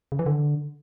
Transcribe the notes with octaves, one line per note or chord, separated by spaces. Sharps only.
C#3
E3
D3